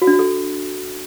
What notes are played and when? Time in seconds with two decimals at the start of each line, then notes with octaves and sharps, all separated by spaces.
0.02 F#4
0.07 D4
0.13 F#4
0.19 A4